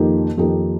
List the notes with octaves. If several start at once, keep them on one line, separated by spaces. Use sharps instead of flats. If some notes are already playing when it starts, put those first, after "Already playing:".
Already playing: F2 D#3 A#3 D#4 G4
F2 D#3 A#3 D#4 G4